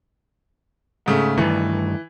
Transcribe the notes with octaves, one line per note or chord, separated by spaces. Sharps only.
G#2 C#3 A3
G2 D#3 E3 A3